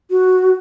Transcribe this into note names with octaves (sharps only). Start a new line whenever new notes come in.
F#4